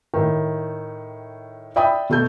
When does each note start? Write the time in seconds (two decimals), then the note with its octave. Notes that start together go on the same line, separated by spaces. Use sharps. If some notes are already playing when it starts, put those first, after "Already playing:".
0.14 A2 D#3
1.76 D5 E5 G5 B5 D#6
2.09 B2 A3 G6